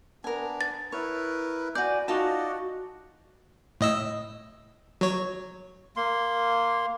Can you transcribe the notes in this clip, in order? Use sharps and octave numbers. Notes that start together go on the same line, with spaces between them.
B3 D4 A#4 G#5
A6
E4 A#4 B4 C#5
F#4 D5 G#5 G6
D#4 F4 F#4 D5 D#5 A5
A2 D#5 E6
F#3 C#5
A#3 C6